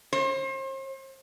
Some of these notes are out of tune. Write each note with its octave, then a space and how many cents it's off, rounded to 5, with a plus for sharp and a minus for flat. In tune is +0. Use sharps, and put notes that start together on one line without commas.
C5 +40